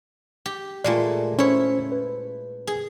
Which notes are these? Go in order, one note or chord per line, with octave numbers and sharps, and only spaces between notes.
G4
A#2 G#3 A3 F4 D5
C#4 E4 C5 C#5
B4
G#4